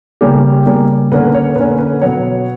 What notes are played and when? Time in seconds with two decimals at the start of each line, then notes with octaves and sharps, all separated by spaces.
0.21 C#3 G3 A#3 C#4 G4
0.66 C#3 G3 A#3 C#4
1.12 D3 A#3 C#4 B4
1.34 C#5
1.56 D3 A#3 C#4 B4
1.79 B4
2.01 B2 F#3 B3 C#5